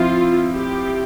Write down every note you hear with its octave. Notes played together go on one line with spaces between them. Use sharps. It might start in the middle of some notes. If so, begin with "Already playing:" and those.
Already playing: F3 C4 E4 F4
G4